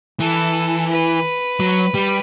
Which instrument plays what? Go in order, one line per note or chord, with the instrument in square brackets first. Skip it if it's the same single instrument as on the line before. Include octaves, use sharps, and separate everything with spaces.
[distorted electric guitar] E3 [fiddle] A4
[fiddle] B4
[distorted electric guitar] F#3
G3